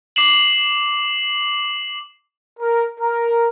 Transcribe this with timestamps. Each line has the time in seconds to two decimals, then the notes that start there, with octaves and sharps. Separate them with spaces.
0.16 D6 C7 E7 F#7
2.59 A#4
3.00 A#4